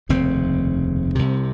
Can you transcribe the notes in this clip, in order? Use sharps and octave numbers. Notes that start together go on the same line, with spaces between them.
F1 D#2 C#3 C4
C2 C3